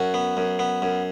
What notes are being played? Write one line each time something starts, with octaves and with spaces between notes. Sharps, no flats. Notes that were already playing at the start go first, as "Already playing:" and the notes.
Already playing: F#2 F#4
B3
F#2
B3
F#2